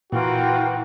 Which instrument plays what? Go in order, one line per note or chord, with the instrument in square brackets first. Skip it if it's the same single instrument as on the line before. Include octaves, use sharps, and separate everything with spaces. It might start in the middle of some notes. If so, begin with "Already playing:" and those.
[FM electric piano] A#2 [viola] E3 [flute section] F4 A#4 G5 [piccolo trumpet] F#4